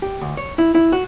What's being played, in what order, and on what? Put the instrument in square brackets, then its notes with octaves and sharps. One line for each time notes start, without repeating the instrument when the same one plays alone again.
[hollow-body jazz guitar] G4
D2
C#5
E4
E4
F#4